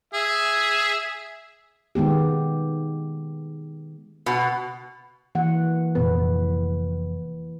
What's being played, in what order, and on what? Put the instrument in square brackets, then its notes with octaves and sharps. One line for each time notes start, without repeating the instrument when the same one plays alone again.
[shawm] G#4 [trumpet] E5
[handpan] D#3 G#3 B3 G4
[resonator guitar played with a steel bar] B2
[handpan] E3 A#3 F#5
[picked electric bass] F1 A#2 B3 [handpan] B4